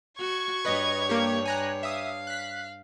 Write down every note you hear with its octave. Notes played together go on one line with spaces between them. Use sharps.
F#4 C#6 G#6
G2 B4 C#5 D#5
A#3 G4
G#5 A#5 F#6
E5 F5 D#6
F#6 B6